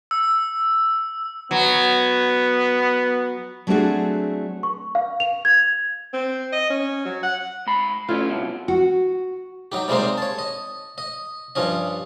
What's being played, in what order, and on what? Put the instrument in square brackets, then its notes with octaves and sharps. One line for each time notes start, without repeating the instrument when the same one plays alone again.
[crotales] E6
[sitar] F#3 [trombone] B3
[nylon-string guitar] F#3 A3 C4 D4 F#4 G#4
[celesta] C#6
F5
F7
G#6
[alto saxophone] C4
D#5
C#4
F#3
F#5
[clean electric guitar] G#2 B5
[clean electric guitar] A3 C#4 [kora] E4 F4
[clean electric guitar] C2 B2
[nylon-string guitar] F#4
[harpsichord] F#3 D#4 G4
C3 G3 G#3 A#3 D#4 C5
C#5 A5
D#5
D#5
G2 F3 C#4 D#5